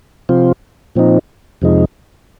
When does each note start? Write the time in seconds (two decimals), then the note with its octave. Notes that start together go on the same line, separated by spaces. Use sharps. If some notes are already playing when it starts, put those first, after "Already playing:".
0.29 C3 F3 C4 F4
0.95 A#2 F3 C4 D#4
1.62 F2 C3 F3 G#3 D#4